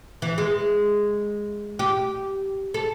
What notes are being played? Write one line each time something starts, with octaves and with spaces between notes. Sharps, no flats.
E3
G#3
G4
A4